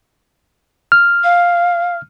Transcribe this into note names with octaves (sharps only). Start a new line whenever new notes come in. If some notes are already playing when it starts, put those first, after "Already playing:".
F6
F5